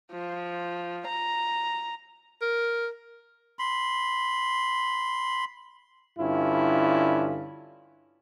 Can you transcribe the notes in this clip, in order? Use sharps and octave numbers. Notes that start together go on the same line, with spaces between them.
F3
A#5
A#4
B5 C6
G2 D3 C#4 E4 F4